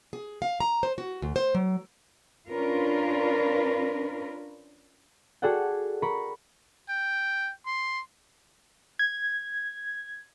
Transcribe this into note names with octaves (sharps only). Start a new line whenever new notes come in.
G#4
F5
A#5
C5
F#4
D2
C5
F#3
C#4 D4 F4 A#4 B4
F#4 G#4 A4 D5 F#5 G5
A#4 B5 C#6
G5
C6
G#6